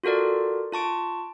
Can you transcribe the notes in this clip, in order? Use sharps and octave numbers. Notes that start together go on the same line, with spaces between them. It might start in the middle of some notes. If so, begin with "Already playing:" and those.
F4 F#4 A4 A#4 D5
F4 A5 C#6 D7